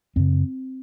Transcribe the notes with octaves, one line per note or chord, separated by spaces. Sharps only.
F#2 C#3 C4